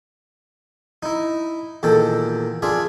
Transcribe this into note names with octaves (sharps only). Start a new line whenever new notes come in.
D#4 E4
E2 A#2 D#3 A4 G5
D4 F4 G#4 E5